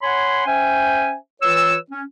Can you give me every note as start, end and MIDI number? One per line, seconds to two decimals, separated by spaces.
0.02 0.43 73
0.02 0.43 78
0.02 0.43 80
0.02 0.43 83
0.02 0.43 84
0.46 1.14 61
0.46 1.14 72
0.46 1.14 76
0.46 1.14 79
0.46 1.14 80
1.42 1.75 52
1.42 1.75 65
1.42 1.75 71
1.42 1.75 73
1.42 1.75 88
1.91 2.02 61